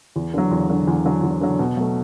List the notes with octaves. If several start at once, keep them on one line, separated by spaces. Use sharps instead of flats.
E2
D3 F#3
E2
D3 F#3
E2
D3 F#3
E2
D3 F#3
B2
F#3 A3